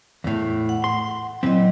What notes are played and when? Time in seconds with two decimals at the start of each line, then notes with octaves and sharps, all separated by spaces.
0.24 E2 A2
0.69 F#5
0.84 C6
1.43 A#2 E3 F#3 C4 D#5